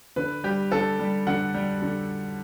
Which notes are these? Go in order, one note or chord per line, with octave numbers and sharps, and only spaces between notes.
D3 B4
G3 G4
D3 A4
G3
D3 F#5
G3
D3